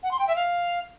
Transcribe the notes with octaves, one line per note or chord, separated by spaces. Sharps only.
F#5
C6
G5
E5
F5